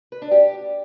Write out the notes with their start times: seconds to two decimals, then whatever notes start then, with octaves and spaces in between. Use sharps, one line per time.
0.12 B4
0.22 D4
0.31 G4